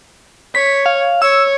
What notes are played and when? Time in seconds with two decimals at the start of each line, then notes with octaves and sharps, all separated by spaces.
0.55 C#5 B6
0.86 F5
1.22 C#5 E6